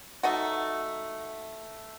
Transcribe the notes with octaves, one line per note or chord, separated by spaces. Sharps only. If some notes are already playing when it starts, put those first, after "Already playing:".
A3 D#4 F#4